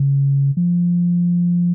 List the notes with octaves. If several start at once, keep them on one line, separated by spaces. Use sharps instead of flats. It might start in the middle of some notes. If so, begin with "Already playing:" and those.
Already playing: C#3
F3